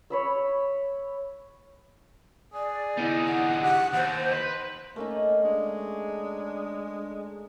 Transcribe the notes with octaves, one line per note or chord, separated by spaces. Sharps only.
C#5 B5 E6
G#4 D5
D3 B3 D#4 E4
F#5
G4 F#5
D#2 C5
B4 D#5 C6
A3 A#3 C#4 D#4
G#3 D4